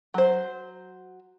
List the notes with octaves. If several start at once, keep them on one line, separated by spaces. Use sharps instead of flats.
F#3 C5